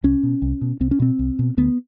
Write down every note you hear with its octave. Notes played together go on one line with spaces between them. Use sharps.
C2 C#4
B2
C2
B2
C2 C4
C#4
B2 C4
C2
B2
D2 B3